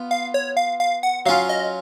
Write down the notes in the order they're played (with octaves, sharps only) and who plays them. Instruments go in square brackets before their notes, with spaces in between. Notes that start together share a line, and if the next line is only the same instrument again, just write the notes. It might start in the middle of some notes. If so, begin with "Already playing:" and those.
Already playing: [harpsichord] B3 F4
[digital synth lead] F5
C#5
F5
F5
F#5
[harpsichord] F#3 C#4 F4 [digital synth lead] F5
[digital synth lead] D#5